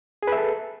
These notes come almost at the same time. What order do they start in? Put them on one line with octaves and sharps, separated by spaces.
G#4 B4 E5 A4